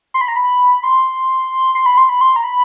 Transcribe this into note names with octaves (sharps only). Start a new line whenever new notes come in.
C6
B5
A#5
B5
C6
C6
B5
C6
B5
C6
A#5
B5